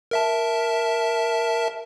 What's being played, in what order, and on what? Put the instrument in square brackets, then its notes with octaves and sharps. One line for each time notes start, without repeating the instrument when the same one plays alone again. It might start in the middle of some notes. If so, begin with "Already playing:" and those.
[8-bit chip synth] A#4 E5 A5